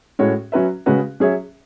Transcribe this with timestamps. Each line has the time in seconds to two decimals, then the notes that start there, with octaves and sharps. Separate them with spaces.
0.19 A2 G#3 C#4 F#4 C#5
0.52 F#3 C#4 F#4 B4 E5
0.86 C#3 G#3 C#4 F#4 B4
1.20 F#3 C#4 G#4 C#5 E5